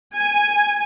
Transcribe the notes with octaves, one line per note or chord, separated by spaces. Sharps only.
G#5